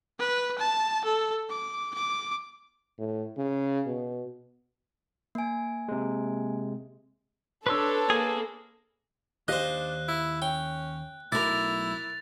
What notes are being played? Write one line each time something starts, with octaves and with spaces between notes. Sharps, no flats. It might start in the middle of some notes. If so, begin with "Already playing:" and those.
B4
A5
A4
D6
D6
A2
C#3
B2
A#3 G#5
C3 G#3
D4 A4 B4 C#5 C6 E6
A#3 G#4
D#2 D4 G4 C5 D#5 F5 F#6
E4
C#4 G5
B1 A3 E4 A#4 B5 D6 A6 F7